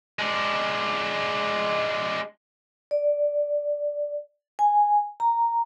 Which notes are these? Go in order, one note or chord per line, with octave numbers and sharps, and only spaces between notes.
G#3 D4
D5
G#5
A#5